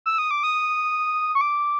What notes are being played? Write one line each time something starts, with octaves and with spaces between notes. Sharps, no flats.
E6
D#6
D6
D#6
C#6
D6